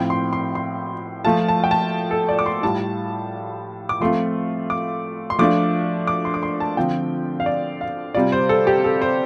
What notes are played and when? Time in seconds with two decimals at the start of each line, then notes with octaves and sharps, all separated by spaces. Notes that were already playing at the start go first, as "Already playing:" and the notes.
Already playing: A2 F3 C4 G5
0.10 C6
0.33 C6
0.55 C6
1.25 F3 A3 F4 A5
1.48 A5
1.64 G5
1.71 A5
2.11 A4
2.29 D5
2.39 D6
2.46 C6
2.63 A2 G3 F4 A5
3.89 D6
4.00 F3 A3 C4 F4 C6
4.70 D6
5.30 C6
5.39 F3 A3 D4 F4 D6
6.07 D6
6.25 C6
6.34 D6
6.43 C6
6.60 A5
6.77 D3 F3 C4 F4 G5
7.40 F5
7.46 D5
7.81 F5
8.15 C3 G3 F4 D5
8.32 C5
8.49 A4
8.67 G4
8.84 A4
9.02 C5